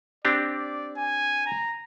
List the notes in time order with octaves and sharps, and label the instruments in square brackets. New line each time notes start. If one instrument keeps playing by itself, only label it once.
[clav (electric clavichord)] C4 D4 G4 [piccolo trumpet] D5
[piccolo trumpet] G#5
A#5